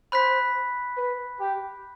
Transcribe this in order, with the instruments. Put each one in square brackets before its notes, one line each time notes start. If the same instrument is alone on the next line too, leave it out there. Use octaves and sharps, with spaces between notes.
[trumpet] C5 [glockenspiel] B5 F#6 B6
[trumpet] B4
G4